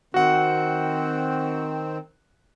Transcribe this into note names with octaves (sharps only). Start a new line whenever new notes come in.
D#3 C4 F#4 F#5